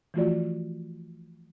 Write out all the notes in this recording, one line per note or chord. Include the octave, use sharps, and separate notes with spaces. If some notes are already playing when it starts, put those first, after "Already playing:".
E3 F3 A3 F4 F#4 D5